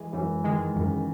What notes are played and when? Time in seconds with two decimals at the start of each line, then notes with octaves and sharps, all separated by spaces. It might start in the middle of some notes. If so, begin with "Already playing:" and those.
Already playing: E3 G#3
0.13 F#2 E3
0.44 D#3 G#3
0.75 F#2 C#3